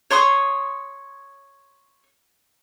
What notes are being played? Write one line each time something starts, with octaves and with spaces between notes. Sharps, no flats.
C#5 C6 C#6 D#6